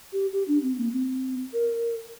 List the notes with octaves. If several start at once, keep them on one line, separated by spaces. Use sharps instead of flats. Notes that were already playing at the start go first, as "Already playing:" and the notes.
G4
G4
D4
C4
A#3
C4
A#4